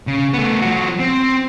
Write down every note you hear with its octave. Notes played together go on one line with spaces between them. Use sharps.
C#3
A3 B3
F3 F#4
C4